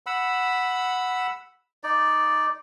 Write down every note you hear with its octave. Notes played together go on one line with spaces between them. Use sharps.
F#5 B5 E6
D#4 D5